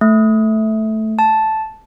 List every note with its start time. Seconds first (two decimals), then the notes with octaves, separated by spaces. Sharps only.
0.01 A3
1.19 A5